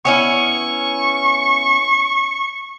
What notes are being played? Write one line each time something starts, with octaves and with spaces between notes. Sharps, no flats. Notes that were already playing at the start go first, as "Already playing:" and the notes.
B3 C#4 E4 C#6